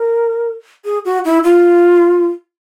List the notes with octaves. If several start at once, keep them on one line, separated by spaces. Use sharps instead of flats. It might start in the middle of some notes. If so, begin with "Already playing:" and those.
Already playing: A#4
G#4
F#4
E4
F4